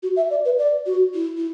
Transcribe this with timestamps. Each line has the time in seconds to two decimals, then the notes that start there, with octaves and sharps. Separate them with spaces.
0.03 F#4
0.16 E5
0.30 D5
0.45 B4
0.59 D5
0.86 F#4
1.14 E4
1.37 E4